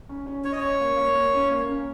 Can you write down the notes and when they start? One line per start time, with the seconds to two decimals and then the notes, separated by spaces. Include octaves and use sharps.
0.09 C#4
0.26 C#4
0.44 C#4 C#5
0.52 D#5
0.60 C#4 C#5
0.81 A#3
0.97 A#3
1.15 A#3
1.34 C#4
1.51 A#3
1.69 C#4